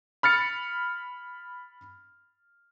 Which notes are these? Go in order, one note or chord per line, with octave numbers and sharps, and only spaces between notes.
B5 F6 A6 C#7